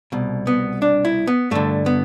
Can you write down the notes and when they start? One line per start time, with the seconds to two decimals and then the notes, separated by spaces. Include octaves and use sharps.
0.12 C2 B2
0.47 B3
0.82 D4
1.05 E4
1.27 B3
1.51 G2 D3 A3
1.86 B3